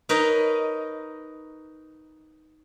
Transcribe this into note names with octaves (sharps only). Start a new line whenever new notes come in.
D#4 A#4 B4 C#5 D#5